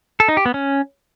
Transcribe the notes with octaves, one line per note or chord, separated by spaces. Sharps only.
A4
D#4
G4
B3
C#4